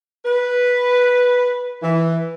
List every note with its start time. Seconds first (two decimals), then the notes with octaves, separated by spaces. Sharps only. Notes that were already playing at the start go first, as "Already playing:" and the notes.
0.25 B4
1.81 E3